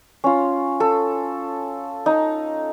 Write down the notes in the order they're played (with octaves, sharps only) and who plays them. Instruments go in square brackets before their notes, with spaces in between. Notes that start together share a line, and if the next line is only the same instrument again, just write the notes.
[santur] C#4 F4
A4
D#4